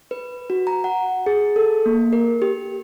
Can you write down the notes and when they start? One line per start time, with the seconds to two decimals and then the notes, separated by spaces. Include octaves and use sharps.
0.11 B4
0.50 F#4
0.67 A#5
0.84 F#5
1.26 G#4
1.56 A4
1.86 A#3
2.13 A#4
2.42 G4